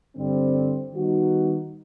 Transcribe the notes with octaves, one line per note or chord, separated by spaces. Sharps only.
G2 D3 G3 C4
D#3 G3 B3 D#4 F#4